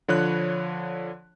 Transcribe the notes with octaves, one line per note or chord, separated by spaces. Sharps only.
D3 F3 C#5 B5 F#6